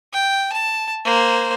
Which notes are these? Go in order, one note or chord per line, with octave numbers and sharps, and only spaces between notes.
G5
A5
A#3 C5